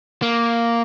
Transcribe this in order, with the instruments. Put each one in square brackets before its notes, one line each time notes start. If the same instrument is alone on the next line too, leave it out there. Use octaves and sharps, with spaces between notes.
[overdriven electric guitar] A#3